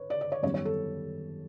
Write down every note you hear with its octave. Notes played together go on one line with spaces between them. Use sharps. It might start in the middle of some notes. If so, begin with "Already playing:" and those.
Already playing: B4 C#5
D5
D5
C#5
F#2 D#3 G3 B3 C#5
C#5
A4